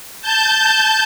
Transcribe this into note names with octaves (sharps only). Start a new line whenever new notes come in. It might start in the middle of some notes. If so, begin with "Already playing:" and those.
A5 G6